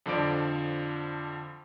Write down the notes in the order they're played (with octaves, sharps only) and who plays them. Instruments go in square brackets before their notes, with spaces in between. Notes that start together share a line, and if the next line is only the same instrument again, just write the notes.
[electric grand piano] F2 D3 F3 D5 D7